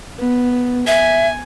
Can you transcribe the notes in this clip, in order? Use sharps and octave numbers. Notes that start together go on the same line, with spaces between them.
B3
E5 G#5